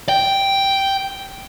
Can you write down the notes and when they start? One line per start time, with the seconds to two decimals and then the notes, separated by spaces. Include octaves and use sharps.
0.09 G5